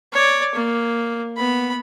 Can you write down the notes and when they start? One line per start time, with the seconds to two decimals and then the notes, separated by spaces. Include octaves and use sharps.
0.13 C#5 D5
0.55 A#3
1.37 B3 B5